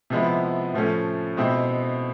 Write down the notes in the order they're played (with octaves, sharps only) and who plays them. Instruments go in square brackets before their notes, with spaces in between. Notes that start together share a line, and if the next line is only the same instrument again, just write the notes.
[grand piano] C3 F3 G#3 B3 E4
A2 F3 A3 C#4
B2 G#3 C4 E4